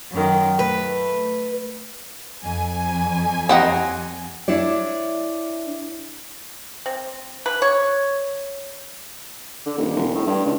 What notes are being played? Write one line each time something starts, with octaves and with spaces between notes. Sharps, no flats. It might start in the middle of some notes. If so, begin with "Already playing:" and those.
F#2 D#3
A3 B4
F2 G#5
G3 C4 D#5 F#5 A#5
D4 E4 C#5 D5
C4
B4
C#5
D3
D#1
E1
A2
G2
C#2